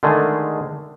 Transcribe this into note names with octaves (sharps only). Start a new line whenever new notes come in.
D3 D#3 G#3 A3 G#4